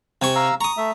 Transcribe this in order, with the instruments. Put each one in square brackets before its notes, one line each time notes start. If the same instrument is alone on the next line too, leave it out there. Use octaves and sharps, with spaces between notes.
[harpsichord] C3 G#5 C#6
[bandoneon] F5 A#5 E6
[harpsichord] A#5 D#6 [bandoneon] C#6
[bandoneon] A3 E5